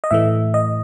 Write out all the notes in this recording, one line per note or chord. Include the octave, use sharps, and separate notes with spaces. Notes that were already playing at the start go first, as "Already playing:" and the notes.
D#5
A2 E3 A3 E5
D#5